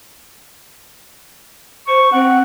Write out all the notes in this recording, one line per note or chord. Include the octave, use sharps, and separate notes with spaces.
C5 C#6
C4 F#5